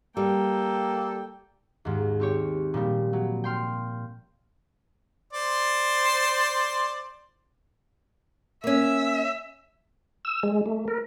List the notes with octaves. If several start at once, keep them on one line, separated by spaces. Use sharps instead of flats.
G3 A#3 A4 G5
D#2 G#2
C4 G4 C#5
A#2 F3 G3
F#3
G5 C6 F6
C5 D5 C6
A#3 C#4 E5
E6
G#3
A3
A#4